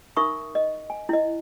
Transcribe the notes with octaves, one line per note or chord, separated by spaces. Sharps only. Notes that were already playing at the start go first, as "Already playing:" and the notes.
D#4 A#4 E5 B5 C#6 D#6
D#5
G#5
E4 D#5